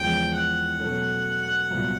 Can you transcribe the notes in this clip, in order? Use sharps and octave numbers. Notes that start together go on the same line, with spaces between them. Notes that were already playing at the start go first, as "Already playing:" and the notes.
Already playing: E2 C#3 F3 G#3 G5
F#5
B2 F#3 A3 C#4
C2 A#2 F#3 B3